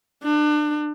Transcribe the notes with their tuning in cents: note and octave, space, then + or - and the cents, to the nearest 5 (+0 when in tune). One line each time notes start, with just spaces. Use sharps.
D4 +30